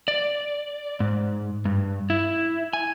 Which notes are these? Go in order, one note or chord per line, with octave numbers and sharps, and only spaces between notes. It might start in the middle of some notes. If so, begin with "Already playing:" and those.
D5
G#2
G2
E4
G#5